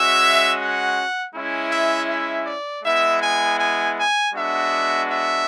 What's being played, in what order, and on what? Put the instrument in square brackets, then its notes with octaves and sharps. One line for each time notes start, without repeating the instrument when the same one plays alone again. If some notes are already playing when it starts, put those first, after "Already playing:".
Already playing: [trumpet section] G#3 C#4 F#4 E5
F#5
G#3 C#4 E4
E5
E5
D5
G#3 B3 E4 E5
G#5
G#5
G#5
G#3 B3 D4 F#4 E5
E5